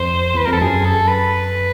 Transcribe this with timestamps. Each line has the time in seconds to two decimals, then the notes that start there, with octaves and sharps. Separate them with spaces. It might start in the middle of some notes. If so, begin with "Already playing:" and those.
Already playing: F2 C5
0.34 E2 B4
0.46 F2 A#4
0.53 A4
0.61 F#2 G#4
0.84 A4
1.08 B4